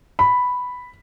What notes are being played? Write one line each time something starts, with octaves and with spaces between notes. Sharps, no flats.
B5